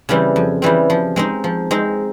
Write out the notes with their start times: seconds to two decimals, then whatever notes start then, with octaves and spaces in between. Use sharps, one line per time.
0.09 C#3 E3 G3 C4
0.36 F2
0.62 C#3 E3 G3 C4
0.90 F3
1.16 G#3 C4 D#4
1.44 F3
1.71 G#3 C4 D#4